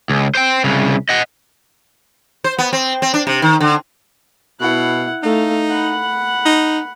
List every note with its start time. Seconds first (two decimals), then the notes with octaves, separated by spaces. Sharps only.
0.10 C#2
0.35 C5 G5
0.64 C2 C#3
1.09 D#5 F#5
2.44 C5
2.59 B3
2.73 C4
3.02 C4
3.14 D4
3.27 C3
3.42 D#3
3.60 D3
4.60 B2 E4 F#5
5.23 A3 D#4 F5
5.69 F#5 B5
6.45 D#4